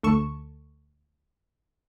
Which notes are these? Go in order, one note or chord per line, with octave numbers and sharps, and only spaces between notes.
D2 A4 C#6 E7